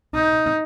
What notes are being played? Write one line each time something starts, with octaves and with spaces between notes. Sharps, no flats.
D#4